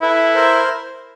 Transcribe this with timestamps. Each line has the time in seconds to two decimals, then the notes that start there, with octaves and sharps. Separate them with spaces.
0.02 E4 A4 B4
0.35 A#4 C5